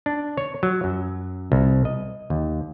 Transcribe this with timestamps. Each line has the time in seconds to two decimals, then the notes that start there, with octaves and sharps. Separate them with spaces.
0.06 D4
0.37 C#5
0.63 F#3
0.84 F#2
1.52 C2
1.85 D#5
2.30 D#2